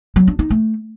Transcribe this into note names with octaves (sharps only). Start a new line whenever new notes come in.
F#3
D4
D#4
A3